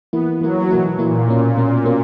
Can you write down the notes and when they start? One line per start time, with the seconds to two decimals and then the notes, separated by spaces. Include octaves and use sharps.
0.13 E3 A#3 B3 E4
0.41 E3 F#3 A#3 E4
0.71 B2 E3 A#3 E4
0.98 A#2 E3 A#3 E4
1.28 B2 A#3 C#4
1.56 B2 A#3 C#4
1.84 B2 A#3 C#4